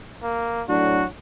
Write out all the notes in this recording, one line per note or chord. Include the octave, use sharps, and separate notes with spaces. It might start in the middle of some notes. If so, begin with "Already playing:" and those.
A#3
A2 F#3 D4 F#4